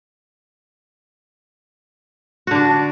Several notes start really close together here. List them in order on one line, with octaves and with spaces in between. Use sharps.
F#4 D3 D4